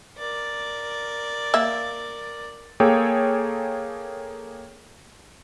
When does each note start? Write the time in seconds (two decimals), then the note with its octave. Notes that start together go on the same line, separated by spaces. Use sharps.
0.18 A#4 D5
1.54 A#3 E5
2.80 A#3 G#4 A4 C#5 G5